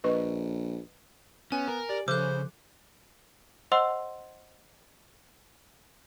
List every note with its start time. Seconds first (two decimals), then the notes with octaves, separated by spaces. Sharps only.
0.04 A#1 B4 D#5 C#6
1.52 B3 C#4 G#5
1.68 A#4
1.89 G4 D5
2.08 C#3 F3 A4 C5 D6 F#6
3.72 C5 D#5 F#5 C6 E6